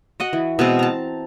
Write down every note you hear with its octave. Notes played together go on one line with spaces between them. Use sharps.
F#4 D#5 F#5
E3
B2 G#3 C4
A5 A#5